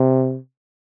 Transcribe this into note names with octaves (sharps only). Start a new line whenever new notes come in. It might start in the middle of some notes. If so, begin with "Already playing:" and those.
Already playing: C3